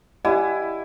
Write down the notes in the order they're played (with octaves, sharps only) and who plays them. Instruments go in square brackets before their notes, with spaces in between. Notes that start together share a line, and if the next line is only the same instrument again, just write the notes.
[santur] E4 G#5 D6 [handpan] G4 D5 F#5 [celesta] D#5